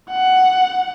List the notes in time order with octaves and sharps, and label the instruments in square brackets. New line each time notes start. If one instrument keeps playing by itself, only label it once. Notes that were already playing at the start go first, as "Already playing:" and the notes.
[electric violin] F#5